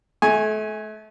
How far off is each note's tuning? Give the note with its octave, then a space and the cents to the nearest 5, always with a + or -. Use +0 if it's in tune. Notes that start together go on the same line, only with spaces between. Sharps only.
A3 -35 G#5 +0 C#6 +0